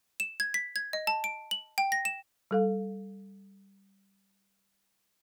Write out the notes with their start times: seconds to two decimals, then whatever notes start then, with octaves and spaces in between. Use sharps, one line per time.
0.20 E7
0.40 G#6
0.54 B6
0.76 G#6
0.93 D#5
1.07 A5
1.24 D7
1.51 F#7
1.78 G5
1.92 A#6
2.05 E7
2.51 G3 A4 F5